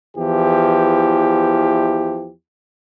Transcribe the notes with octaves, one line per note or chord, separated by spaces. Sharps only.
E2 E3 F3 G4